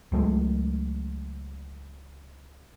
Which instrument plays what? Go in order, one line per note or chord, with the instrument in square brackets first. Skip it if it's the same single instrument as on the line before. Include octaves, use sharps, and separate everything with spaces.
[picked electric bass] C#2 F#3 G#3 A3